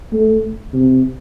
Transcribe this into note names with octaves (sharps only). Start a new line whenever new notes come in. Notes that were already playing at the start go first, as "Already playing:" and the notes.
A3
C3